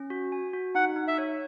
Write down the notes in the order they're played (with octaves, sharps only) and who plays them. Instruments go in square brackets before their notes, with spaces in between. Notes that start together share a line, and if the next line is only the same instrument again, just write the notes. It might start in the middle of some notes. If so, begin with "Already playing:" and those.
Already playing: [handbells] C#4
F#4
G#5
F#4
[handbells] D#4 [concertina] F#5
[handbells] D#4
[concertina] E5
[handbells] C#5